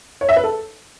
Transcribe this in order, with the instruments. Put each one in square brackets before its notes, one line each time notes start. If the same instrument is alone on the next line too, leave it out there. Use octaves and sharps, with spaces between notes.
[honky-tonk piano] C#5
E5
B4
A4